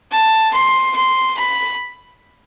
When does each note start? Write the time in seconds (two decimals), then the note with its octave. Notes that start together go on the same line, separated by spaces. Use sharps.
0.11 A5
0.53 C6
0.96 C6
1.37 B5